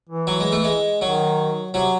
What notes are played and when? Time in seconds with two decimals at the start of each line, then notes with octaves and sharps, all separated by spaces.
0.09 E3
0.27 F#3
0.40 G#3
0.52 A3
0.64 G#3
1.01 D#3 F#3
1.74 C3 F#3